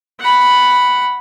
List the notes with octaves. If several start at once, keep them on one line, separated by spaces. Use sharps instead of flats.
F#5 B5